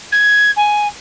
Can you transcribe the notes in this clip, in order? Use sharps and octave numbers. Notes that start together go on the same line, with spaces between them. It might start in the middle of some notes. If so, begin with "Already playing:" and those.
G#6
G#5